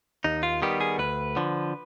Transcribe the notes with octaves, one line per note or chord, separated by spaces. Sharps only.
D#2 D#4
F4
D#3 G3 B3 G4
G#4
D2 B4
D3 F3